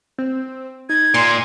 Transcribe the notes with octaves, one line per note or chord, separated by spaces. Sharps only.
C4
D#4 G#6
A#2 C6